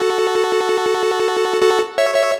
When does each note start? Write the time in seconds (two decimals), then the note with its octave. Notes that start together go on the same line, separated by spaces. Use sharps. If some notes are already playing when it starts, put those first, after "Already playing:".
Already playing: F#4 A4
1.62 F#4 A4
1.98 C#5 E5
2.14 C#5 E5